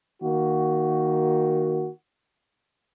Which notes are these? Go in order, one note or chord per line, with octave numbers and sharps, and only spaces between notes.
D#3 A#3 F#4